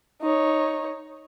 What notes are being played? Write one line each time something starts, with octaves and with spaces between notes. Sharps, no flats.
D#4 C#5